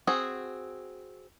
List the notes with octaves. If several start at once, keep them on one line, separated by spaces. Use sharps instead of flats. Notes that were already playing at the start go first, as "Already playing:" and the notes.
C4 F#4 G#4